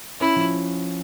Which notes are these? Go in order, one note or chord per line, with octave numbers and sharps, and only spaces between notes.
C#4 E4
F3